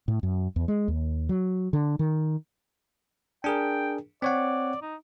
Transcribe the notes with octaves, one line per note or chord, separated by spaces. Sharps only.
A2
F#2
E2
G#3
D#2
F#3
D3
D#3
D4 G#4 A#4 G5
C4 C#5 D5 F#5
D#4